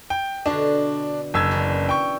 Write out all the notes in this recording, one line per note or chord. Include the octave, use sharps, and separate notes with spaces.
G5
B2 D3 D4
F#1 E6 G#6
F#2 E3 D4
G5 C#6